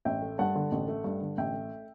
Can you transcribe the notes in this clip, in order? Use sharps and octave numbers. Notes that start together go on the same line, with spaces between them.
A1 E5 G5
A3
G2 F#5 A5
D3
A1
A3
G2
D3
A1 E5 G5
A3